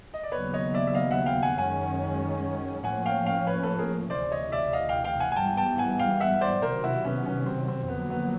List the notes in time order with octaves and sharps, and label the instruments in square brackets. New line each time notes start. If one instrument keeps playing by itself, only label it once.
[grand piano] D#5
D5
[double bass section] D#2 C#3 F#3 B3 [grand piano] B4 C#5
[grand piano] C#5 D#5
D5 E5
E5
D#5 F5
E5 F#5
F5 G5
F#5 G#5
[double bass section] F#2 D#3 G#3 C#4 [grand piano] F#5 G#5
[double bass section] A2 F3 A#3 C#4 [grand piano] F#5 G#5
[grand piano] F5 G5
F5 G5
B4 C#5
A4 B4
G#4 A#4
[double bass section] D2 C3 E3 [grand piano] C5 D5
[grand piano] C#5 D#5
D5 E5
D#5 F5
F5 G5
F5 G5
F#5 G#5
G#5
[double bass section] G#2 E3 G3 B3 [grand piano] G5 A5
[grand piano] G5 A5
F#5 G#5
F5 G5
E5 F#5
C5 D5
[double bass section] C3 D#3 F#3 [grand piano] A#4 C5
[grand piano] E4 F#4
B3 C#4
B3 C#4
C4
C4
C4
[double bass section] F2 D3 F#3 A#3 [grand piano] B3
[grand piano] B3